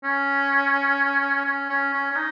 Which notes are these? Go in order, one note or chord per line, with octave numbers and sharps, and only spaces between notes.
C#4
C#4
C#4
C#4
C#4
D#4